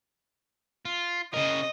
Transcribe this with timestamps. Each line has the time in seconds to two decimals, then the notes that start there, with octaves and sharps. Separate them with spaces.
0.85 F4
1.34 C#3 A#4 D#5